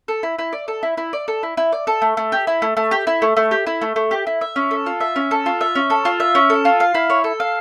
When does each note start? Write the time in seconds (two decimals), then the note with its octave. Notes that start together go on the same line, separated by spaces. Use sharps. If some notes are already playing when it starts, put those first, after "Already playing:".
0.08 A4
0.23 E4
0.38 E4
0.53 D5
0.68 A4
0.83 E4
0.97 E4
1.13 D5
1.28 A4
1.43 E4
1.57 E4
1.72 D5
1.87 A4
2.02 A3
2.17 A3
2.32 G4
2.47 E4
2.62 A3
2.77 A3
2.91 G4
3.07 E4
3.22 A3
3.37 A3
3.51 G4
3.67 E4
3.81 A3
3.96 A3
4.11 G4
4.27 E4
4.41 E5
4.56 C#4
4.71 A4
4.86 F4
5.00 E5
5.16 C#4
5.31 A4
5.46 F4
5.61 E5
5.75 C#4
5.90 A4
6.05 F4
6.20 E5
6.35 C#4
6.50 A4
6.65 F4
6.80 F5
6.95 E4
7.10 C#5
7.24 A4
7.40 F5